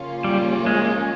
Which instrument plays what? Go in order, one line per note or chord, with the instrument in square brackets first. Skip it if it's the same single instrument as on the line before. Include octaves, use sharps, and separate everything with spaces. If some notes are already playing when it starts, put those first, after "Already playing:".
Already playing: [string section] C#3 F3 A#3 C#4 F4
[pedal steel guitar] G3
G#3